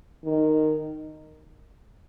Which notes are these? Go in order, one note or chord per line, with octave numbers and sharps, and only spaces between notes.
D#3